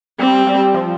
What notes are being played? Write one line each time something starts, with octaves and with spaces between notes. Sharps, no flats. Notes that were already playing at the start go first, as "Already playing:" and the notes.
G3 C4
G3
F3